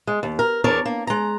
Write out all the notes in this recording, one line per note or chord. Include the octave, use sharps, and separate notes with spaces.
G#3
D#2
A#4
E2 D4 A#4 C#5
A#3
G#3 A#5